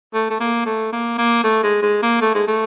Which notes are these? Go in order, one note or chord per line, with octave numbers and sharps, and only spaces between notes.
A3
A3
A#3
A3
A#3
A#3
A3
G#3
G#3
A#3
A3
G#3
A3